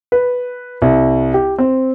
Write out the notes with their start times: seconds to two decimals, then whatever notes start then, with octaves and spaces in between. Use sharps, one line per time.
0.12 B4
0.82 C2
1.34 G4
1.58 C4